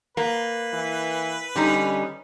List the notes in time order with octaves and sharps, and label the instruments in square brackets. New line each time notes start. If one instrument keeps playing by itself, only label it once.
[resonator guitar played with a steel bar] A#3 [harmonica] B4
[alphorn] E3
[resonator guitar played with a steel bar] D3 G3 D#4 [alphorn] C#4